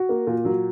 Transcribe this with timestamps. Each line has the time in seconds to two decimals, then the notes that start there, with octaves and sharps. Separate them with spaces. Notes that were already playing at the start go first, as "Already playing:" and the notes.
Already playing: F#4
0.09 A#3
0.27 A#2
0.45 F#3